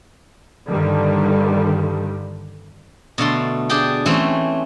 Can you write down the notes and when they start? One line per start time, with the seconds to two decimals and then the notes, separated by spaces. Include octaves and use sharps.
0.68 G2 D3 D#3 G3
3.18 B2 D3 A3 C6
3.69 D4 G4 G#4 G5
4.06 E3 A3 C4 C#4